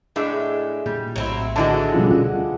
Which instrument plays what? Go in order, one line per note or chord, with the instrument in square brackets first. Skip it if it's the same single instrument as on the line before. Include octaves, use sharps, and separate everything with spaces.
[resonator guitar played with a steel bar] A2 D4 E5 [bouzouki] G#3
[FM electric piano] A#2 [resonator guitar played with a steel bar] G3
[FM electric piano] A#1 A2 [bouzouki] F#3 C4 E4
[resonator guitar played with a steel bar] D3 E4 F#4 [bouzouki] E3 G#3 D4 [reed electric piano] A5
[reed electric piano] B2 C#4 F4 [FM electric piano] F3 G3
[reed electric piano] D2 [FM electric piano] F4 F#5